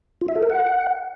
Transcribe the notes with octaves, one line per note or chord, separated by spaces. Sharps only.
F4
E5
A4
A#4
F#5